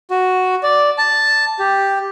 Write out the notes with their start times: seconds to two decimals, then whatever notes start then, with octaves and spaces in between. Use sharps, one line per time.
0.10 F#4
0.63 D5
0.98 A5
1.59 G4